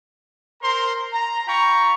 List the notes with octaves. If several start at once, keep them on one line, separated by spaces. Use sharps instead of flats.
A#4 C5 A#5 C6
A#5
F4 G5 A#5 B5 C#6